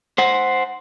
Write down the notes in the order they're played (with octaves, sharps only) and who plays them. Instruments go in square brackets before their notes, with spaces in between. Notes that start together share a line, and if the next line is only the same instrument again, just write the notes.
[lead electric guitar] C5 F#5